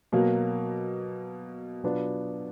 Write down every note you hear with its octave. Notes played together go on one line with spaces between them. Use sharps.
B2 F#3 A#3
B2 F#3 B3 D4 F4